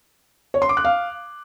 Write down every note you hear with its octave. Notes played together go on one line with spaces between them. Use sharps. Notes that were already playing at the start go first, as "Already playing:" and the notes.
C#5
C6
D6
F#6
F5